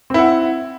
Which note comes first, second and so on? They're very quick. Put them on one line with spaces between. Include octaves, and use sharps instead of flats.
C4 E4 F#5